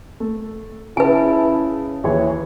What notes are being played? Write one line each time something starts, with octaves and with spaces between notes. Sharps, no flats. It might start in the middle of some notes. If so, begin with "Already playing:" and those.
A3
C#3 E4 B4 G#5 A5
D#2 E3 G#4 C#5